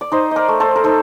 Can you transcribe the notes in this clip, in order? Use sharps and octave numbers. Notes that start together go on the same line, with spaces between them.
D5
D#4 C5 D#5
A#4 D5 D#5
A3
A4 C5
A#4
D#4 A4 C5